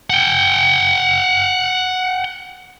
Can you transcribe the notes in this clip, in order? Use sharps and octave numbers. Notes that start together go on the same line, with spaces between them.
F#5 G5